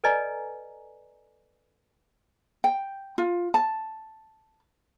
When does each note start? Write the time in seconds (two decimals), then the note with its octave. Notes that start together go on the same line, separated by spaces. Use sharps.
0.04 A4 B4 D5 D#5 G#5 A#5
2.64 G5
3.18 F4
3.54 A5